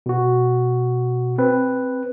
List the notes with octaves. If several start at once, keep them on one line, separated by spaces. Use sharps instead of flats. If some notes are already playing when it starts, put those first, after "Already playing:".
B2 F#4
C4 B4